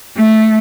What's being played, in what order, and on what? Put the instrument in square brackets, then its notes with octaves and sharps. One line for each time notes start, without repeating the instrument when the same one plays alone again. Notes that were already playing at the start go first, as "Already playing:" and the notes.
[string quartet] A3